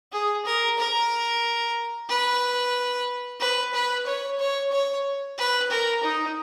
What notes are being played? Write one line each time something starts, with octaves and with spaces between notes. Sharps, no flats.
G#4
A#4
A#4
B4
B4
B4
C#5
C#5
C#5
B4
A#4
D#4